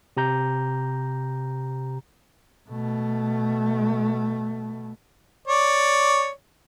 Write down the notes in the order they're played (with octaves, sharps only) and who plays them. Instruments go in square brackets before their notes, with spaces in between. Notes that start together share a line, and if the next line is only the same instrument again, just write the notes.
[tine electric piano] C3 G4 A#5 G6
[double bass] B2 A3
[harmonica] C#5 D5